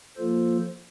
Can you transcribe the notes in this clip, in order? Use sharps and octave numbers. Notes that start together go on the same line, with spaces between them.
F3 A#3 F4 A4 C5